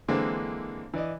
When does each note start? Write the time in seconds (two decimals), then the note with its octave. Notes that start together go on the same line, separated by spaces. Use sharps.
0.08 D3 E3 G#3 A#3 C4
0.94 E3 D5 D#5